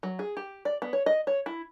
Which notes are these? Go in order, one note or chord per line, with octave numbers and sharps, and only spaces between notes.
F#3
G#4
G4
D5
B3
C#5
D#5
C#5
E4